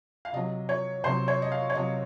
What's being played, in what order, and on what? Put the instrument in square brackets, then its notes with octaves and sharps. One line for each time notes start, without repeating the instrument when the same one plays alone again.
[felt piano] F5
C3 F#3 D#5
C#5
C3 F#3 C5
C#5
D#5
F5
C#5
C3 F#3 D#5